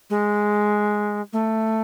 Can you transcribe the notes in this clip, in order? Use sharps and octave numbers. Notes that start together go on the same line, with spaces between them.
G#3
A3